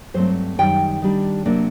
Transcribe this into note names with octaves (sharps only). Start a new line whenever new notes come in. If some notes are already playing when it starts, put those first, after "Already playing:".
G2 F#3 A3 C4 C5
F#2 D#3 G3 G5
D#3 G3 D4
C3 F#3 A#3 D4